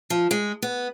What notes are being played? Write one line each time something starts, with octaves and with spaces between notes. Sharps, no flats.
F3
G#3
B3